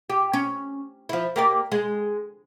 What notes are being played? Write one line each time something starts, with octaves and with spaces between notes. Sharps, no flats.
G4
C#4
F3 E4
A#3 G4 D5
G#3